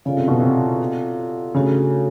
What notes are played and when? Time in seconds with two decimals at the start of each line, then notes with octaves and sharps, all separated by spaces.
0.05 C#3 F4 A4 D5 F5
0.17 C3
0.28 B2
0.40 C3
1.54 C#3 A3 D4 F#4 A4